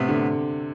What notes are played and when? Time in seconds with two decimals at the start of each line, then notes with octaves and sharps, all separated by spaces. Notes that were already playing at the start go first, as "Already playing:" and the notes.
Already playing: A2 C3 B3 D4
0.09 D3